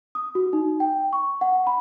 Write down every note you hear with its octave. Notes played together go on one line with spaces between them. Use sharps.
D#6
F#4
D#4
G5
C#6
F#5
B5